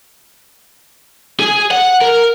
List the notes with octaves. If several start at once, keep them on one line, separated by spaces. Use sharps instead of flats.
G#4
F#5
A#4